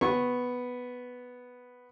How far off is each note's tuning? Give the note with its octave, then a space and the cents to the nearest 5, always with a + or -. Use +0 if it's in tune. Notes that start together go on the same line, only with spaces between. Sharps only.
B3 +0 C#6 -20